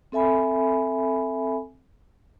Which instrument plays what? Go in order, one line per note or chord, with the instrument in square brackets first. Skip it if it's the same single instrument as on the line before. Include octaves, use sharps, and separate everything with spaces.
[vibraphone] C4 A4 E5 G#5 B5